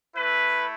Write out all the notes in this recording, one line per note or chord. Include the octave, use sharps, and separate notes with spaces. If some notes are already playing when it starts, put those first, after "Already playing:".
A3 E4 B4